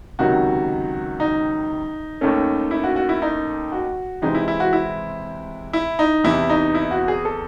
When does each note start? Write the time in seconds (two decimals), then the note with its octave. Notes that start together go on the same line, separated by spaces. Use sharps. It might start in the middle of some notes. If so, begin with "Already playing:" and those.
0.19 C#2 C3 D#3 F#3 F#4
1.20 D#4
2.21 D#2 D#3 A3 C#4
2.71 E4
2.84 F#4
2.96 F#4
3.09 E4
3.22 D#4
3.72 F#4
4.22 C3 E3 G#3 C4 D#4
4.35 E4
4.48 E4
4.60 F#4
4.73 E4
5.73 E4
5.99 D#4
6.24 E2 C3 E3 E4
6.49 D#4
6.75 E4
6.91 F#4
7.08 G#4
7.25 A4